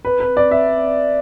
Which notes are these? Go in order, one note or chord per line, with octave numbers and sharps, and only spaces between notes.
B4
B4
D5
E5